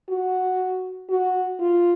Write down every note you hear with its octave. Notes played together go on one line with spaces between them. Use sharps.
F#4
F#4
F4